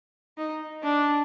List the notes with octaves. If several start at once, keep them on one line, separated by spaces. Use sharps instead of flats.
D#4
D4